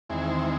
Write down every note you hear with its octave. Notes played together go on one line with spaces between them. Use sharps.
E2 D#3 G#3 C4 E4 G#4
C5